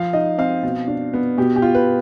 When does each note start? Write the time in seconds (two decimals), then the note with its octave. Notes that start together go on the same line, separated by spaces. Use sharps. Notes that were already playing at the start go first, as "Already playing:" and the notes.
Already playing: F3 F5
0.13 D#4 D#5
0.38 C4 F5
0.63 B2
0.88 D4
1.13 B3
1.38 B2 G4
1.56 G4
1.62 F4
1.75 B4